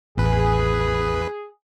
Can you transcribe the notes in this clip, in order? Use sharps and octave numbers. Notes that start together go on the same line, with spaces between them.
A1 E2 G#4 B4